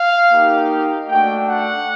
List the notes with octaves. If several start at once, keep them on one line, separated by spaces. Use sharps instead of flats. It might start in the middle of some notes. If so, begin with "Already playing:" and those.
Already playing: F5
A#3 D#4 G4
A3 D4 F#4 G5
F#5